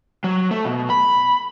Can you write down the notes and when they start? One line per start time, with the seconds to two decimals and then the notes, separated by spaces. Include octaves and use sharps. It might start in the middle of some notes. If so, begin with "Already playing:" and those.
0.24 F#3
0.51 A3
0.65 B2
0.90 B5